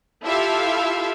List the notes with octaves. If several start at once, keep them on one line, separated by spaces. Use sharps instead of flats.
E4 F4 G4 A4 E5 F5